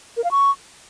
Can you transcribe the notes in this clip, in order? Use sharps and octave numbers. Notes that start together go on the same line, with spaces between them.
A#4
F5
C#6